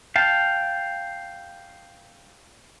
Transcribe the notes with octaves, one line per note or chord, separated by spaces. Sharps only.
F5 G5 A5